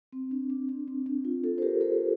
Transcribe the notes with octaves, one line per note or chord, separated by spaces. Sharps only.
C4
D4
D4
D4
C4
D4
F4
F4 A4
C5
G4 A#4
A4 C5